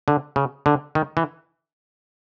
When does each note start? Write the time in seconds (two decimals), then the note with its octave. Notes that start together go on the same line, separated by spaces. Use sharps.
0.08 D3
0.36 C#3
0.66 D3
0.95 D#3
1.17 E3